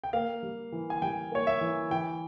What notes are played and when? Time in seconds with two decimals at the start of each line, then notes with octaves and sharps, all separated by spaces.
0.04 G5
0.13 A#3 F5
0.43 G3
0.72 E3
0.90 G#5
1.02 G3 G5
1.32 A#3 C#5
1.47 E5
1.61 E3
1.91 E3 G5